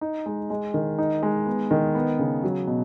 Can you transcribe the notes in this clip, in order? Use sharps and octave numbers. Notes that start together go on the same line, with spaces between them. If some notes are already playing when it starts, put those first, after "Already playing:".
D#4
G#3
G#3
D#3
D#4
G#3
B3
D#3
B3
C#3
F#3
B2